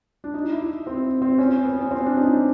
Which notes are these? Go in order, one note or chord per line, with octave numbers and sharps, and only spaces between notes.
D4
D#4
E4
C4
C4
C#4
B3
C#4
C4
D4
D#4